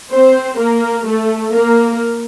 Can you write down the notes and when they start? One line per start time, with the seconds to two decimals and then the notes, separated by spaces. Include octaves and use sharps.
0.11 C4 C5
0.58 A#3 A#4
1.06 A3 A4
1.53 A#3 A#4